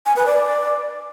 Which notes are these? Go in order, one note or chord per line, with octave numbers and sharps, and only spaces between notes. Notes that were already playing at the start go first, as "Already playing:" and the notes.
G#5
B4
D5